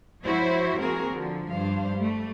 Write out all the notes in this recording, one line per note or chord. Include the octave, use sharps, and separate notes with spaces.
F3 E4 F#4 C5 C#5 E5
F3 A#3 C4 F#4 G#4 A#4
D3 F3
G2 D4 C5 F5
G3 A3